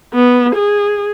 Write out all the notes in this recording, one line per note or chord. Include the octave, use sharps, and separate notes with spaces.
B3
G#4